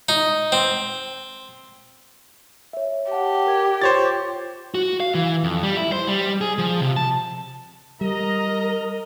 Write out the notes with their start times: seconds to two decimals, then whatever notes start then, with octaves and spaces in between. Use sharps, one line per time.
0.09 D#4
0.52 C4
2.73 C#5 E5
3.12 G4 F#5 A5
3.47 A#4 G#6
3.82 F4 C5 C#5 A6
4.75 F#4
5.00 F5
5.14 E3
5.44 F2
5.63 G3
5.77 E4
5.93 C5
6.08 G3
6.41 G#4
6.58 F3
6.80 C3
6.96 A5
8.01 G3 A#4 D#5 A#5